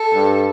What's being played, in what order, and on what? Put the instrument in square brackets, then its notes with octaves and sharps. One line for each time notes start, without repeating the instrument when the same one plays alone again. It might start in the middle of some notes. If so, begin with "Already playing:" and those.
Already playing: [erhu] A4
[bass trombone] G2